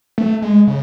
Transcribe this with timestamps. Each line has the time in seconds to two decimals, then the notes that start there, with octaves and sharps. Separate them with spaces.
0.18 A3
0.42 G#3
0.68 C#3